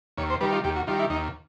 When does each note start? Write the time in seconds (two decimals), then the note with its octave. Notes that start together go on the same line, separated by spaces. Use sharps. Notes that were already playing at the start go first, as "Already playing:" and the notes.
0.17 D#2 C#5
0.30 C5
0.41 D#3 G3 B4
0.52 F4
0.64 D#2 G4
0.76 F#4
0.87 D#3 G3 F4
0.99 E4
1.10 D#2 D#4